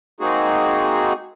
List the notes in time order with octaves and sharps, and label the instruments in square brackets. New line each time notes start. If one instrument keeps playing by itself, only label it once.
[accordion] G#3 A#3 C4 D#4 F#4 G#4